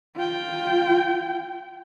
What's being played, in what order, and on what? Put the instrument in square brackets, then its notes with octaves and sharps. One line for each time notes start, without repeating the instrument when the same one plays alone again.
[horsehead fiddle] F4 G5